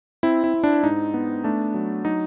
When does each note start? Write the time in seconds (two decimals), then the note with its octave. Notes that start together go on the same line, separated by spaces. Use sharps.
0.23 C4 E4
0.44 E4
0.54 C4
0.64 D4
0.84 G#2 D#4
1.14 B3
1.44 A3 D4
1.74 F#3
2.05 F#3 D#4